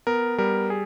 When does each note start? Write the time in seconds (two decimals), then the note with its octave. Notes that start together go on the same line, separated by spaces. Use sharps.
0.07 B3 A#4
0.38 G3 A#4
0.70 G#4